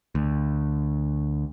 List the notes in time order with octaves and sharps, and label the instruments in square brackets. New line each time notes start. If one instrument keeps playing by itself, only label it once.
[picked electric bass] D2